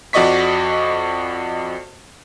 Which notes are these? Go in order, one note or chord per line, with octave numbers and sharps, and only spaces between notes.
F2 F#4 D5 D#5 C#6 B6